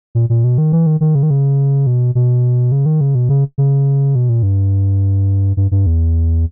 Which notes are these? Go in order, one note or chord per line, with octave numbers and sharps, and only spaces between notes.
A#2
A#2
B2
D#3
E3
D#3
D#3
C#3
D#3
C#3
B2
B2
C#3
D#3
C#3
B2
C#3
C#3
B2
A#2
G2
G2
G2
E2